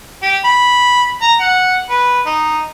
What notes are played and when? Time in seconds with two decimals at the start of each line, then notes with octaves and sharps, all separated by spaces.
0.22 G4
0.45 B5
1.22 A#5
1.40 F#5
1.90 B4
2.26 D#4